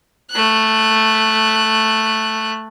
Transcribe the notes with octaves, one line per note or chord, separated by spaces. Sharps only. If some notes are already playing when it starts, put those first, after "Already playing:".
A3 F#6